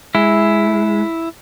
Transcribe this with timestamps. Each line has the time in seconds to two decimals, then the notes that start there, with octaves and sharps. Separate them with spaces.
0.15 G#3 E4